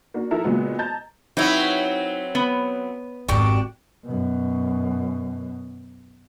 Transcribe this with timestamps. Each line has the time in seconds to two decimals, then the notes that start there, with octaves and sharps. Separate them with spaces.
0.14 A#3 D4 F#4
0.31 F3 E4 A4 A#4 E5
0.44 A#2 C#3 F#3 G#3 A#3 B3
0.78 D#5 A5 A#5 G6 A6
1.37 F#3 C4 D#4 E4 B4 C#5
2.35 B3
3.28 G#1 F2 D4 F#4 G4
4.06 F#2 B2